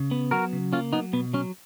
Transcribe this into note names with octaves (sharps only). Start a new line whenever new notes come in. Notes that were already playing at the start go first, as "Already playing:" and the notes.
Already playing: C#3
B3
F#3 F#4 A#4
C#3
A#3 C#4 F4
F#3 B3 D#4
B2 B3
F#3 C#4